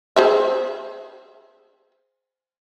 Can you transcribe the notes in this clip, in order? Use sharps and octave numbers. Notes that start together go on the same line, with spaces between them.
G#4 C5 E5